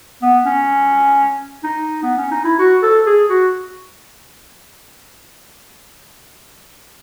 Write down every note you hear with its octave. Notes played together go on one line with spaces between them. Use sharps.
B3
C#4
D#4
B3
C#4
D#4
E4
F#4
A4
G#4
F#4